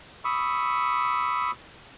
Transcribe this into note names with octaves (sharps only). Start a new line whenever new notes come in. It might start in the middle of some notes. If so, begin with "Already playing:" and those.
B5 C#6 D#6 E6